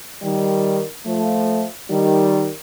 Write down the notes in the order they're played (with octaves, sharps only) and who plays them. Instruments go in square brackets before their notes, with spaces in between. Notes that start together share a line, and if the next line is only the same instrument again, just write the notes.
[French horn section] D#3 G3
F3 A3
D#3 G3